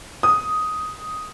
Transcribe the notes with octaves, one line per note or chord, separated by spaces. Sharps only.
D#6